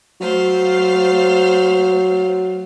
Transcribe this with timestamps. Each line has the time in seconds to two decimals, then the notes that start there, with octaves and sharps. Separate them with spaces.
0.21 F#3 A3 C5 F5